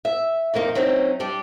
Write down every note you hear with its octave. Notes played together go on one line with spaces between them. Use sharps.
E5
F2 D#3 A#3 D#4
F#3 C4 C#4 D#4
G3 D4 G4